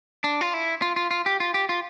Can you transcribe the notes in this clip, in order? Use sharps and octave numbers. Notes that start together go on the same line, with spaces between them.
D4
F4
E4
F4
F4
F4
G4
F4
G4
F4